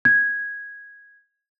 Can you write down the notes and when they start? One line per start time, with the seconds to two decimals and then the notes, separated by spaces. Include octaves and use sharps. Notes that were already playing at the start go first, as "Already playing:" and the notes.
0.05 G#6